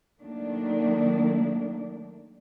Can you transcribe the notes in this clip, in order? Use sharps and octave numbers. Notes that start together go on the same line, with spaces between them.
D#3 F#3 A3 A#3 D4